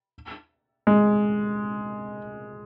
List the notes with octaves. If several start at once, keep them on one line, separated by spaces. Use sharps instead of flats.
G#3